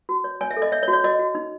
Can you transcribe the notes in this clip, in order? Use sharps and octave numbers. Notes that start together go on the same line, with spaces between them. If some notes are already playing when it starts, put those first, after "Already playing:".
F#4
C#5
C#5 G#5
E5
A4
D#5
C#5 E5
C#5
F#4
C#5
F#4 D#5
F#4
D#4